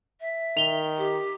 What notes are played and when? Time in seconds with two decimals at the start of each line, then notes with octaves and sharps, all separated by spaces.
0.20 E5
0.57 D#3 F7 G7
0.97 G4